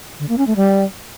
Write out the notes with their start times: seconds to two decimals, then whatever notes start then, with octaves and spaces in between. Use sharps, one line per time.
0.20 D3
0.29 A#3
0.38 C#4
0.47 A3
0.56 G3